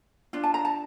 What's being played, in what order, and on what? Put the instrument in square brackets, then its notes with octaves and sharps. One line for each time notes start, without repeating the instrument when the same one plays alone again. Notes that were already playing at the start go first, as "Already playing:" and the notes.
[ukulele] D4 F4
A5
A#5
A5